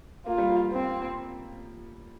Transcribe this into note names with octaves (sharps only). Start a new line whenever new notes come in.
A#3 F4
G3
F3 A#3
C4